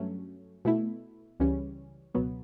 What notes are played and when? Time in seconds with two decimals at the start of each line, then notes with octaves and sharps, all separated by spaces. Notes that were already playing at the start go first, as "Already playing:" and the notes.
Already playing: G2 F#3 A3 C#4
0.65 B2 A3 E4
1.40 C#2 C#3 E3 G3 C#4
2.15 C#2 B2 F#3 B3